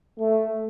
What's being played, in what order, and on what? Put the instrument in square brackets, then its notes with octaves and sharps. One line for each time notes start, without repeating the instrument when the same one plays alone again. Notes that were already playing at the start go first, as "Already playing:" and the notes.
[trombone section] A3